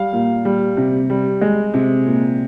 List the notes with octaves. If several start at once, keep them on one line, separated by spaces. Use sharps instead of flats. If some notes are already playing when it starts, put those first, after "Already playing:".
Already playing: G3 F5
A#2
G3
C3
G3
G#3
C3
A#2